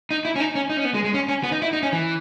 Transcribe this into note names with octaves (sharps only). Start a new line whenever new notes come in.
D#4
E4
C#4
D#4
C#4
D#4
C#4
B3
G#3
G#3
C#4
C#4
B3
D#4
E4
D#4
C#4
E3